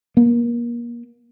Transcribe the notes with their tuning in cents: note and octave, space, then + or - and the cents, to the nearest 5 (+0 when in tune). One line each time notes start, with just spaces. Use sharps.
A#3 +30